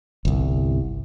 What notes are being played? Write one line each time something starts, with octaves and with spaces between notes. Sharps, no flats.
G1 C2